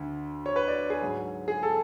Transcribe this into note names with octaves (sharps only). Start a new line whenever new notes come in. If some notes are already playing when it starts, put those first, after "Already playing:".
Already playing: D2 D3
C#5
B4
D5
G#4
G#2 F#3
G#4
A4